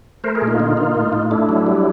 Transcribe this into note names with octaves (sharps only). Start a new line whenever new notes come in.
A3 A#4 C5
G#4 A#4
A#2
D#4 F4
D3
A#3
A2
A2
A3 D4 E4
F#3
G3